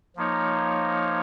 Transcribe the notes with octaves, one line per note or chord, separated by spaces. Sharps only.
F3 A#3 D#4 C#5